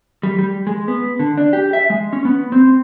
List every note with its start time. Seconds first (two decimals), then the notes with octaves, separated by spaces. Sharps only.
0.23 G3
0.38 G3
0.67 G#3
0.88 B3
1.19 D3
1.38 D4
1.53 G4
1.73 E5
1.90 G#3
2.13 C#4
2.25 B3
2.52 C4